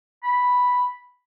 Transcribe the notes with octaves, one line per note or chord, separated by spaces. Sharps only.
B5